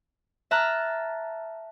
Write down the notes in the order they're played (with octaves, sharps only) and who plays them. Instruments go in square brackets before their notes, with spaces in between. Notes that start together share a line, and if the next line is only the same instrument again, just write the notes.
[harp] E5 A5 A#5 F6 F#6